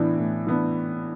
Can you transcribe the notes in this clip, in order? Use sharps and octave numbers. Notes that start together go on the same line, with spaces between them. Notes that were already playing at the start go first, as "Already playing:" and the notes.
Already playing: A2 E3 B3 D4
A2
E3 B3 D4